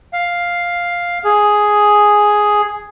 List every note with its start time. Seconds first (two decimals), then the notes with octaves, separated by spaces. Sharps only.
0.13 F5
1.24 G#4